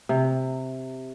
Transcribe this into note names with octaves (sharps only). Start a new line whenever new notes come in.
C3